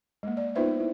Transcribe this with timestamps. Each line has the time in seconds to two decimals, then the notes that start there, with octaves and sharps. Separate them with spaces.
0.23 G#3 A#3
0.37 D5
0.55 B3 D#4 F4 B4 C5 E5
0.80 E4